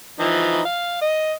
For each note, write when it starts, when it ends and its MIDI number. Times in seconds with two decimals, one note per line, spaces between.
0.20 0.60 52
0.20 0.60 53
0.20 0.60 63
0.65 1.00 77
1.01 1.32 75